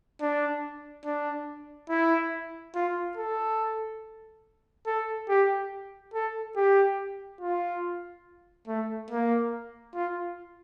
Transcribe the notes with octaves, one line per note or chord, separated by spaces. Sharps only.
D4
D4
E4
F4
A4
A4
G4
A4
G4
F4
A3
A#3
F4